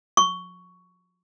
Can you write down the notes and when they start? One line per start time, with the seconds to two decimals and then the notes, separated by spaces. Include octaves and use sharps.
0.17 C#6